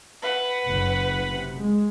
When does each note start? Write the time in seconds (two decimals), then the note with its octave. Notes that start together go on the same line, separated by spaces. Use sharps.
0.22 B4 F#5
0.68 F#1
1.29 C3
1.59 G#3